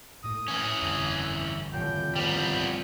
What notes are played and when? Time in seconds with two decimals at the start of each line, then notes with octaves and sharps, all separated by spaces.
0.24 A2 A#3 D#6
0.48 E3 C#4
0.82 G1 F2
1.73 F1 A2 D#3 E3 G5
2.16 C2 G3 A#3 B3 G4 C5